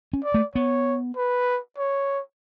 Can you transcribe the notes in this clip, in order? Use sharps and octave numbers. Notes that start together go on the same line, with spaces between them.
C#4
D5
A3
B3 C#5
B4
C#5